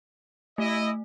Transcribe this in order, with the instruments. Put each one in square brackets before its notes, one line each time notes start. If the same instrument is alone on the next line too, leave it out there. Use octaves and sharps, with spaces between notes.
[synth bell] A3 [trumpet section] E4 D#5